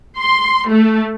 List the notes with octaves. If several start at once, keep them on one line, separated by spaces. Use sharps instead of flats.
C6
A3